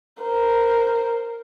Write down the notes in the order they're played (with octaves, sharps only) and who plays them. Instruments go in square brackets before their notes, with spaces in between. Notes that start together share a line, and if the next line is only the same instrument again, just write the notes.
[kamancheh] A#4 C5